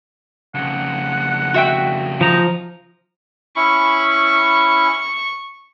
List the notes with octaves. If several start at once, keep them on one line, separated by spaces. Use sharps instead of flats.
F2 C#3 F#5
F#4 E5 G5
F3 D#4 A#5
C#4 E4 B5 C#6